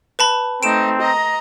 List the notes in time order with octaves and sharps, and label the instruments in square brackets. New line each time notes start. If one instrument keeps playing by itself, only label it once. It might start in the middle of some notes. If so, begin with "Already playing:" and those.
[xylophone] B4 A5 B5
[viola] A3 D#4 [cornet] C4 [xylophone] D7 E7
[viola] D#5 A#5